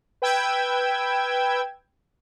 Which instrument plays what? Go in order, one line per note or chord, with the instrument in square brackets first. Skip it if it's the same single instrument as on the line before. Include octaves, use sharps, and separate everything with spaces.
[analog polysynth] B4 G5 E6 G#6